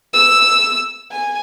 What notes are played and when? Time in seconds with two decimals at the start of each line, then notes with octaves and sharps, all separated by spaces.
0.13 E6
1.11 G#5